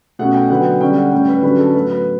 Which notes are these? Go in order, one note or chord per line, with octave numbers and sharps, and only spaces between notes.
B2 A3 C#4 F#5
G5
D3 F#3 B3 F#5
G5
D3 G3 C#4 G5
F#5
A2 G3 C#4 G5
B4
D3 F#3 C#4 B4
A4
A2 F#3 B3 B4
B4